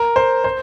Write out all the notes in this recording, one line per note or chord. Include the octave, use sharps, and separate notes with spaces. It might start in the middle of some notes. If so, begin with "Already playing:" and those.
Already playing: A#4
C5
C5